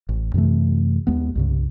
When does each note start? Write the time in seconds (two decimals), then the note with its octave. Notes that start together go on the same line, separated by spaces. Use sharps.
0.09 A1
0.34 F#2 C3 E3 A3
1.07 D#2 G#3 B3
1.35 C2 G2 C#3